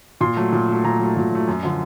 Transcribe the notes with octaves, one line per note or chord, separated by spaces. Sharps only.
A#2 C6
F#3 A3
A#2
F#3 A3
A#2 A#5
F#3 A3
A#2
F#3 A3
F#2
D3 F3